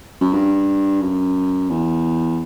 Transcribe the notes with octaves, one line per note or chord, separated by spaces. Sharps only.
F#2
G2
F#2
E2